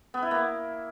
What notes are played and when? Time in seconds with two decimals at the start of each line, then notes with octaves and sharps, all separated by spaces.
0.14 B3
0.22 E4
0.31 A#3